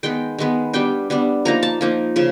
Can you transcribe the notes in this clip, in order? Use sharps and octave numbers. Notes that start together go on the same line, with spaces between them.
D#3 G#3 B3 G5
D#3 G#3 B3
G3 B3 D4 G5
G3 B3 D4
F3 A#3 D#4 A#5
A5
F3 A#3 D#4
C#3 F3